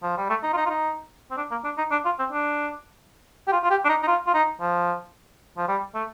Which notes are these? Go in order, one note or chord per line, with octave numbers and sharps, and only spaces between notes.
F3
G3
A3
D#4
F4
D#4
F4
D#4
C4
D4
A#3
D4
D#4
D4
F4
C4
D4
G4
F4
F4
G4
D4
D#4
D#4
F4
F4
D#4
F3
F3
G3
A3